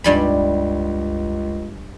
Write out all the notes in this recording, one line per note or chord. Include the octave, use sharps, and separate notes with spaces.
C#2 G2 G3 B5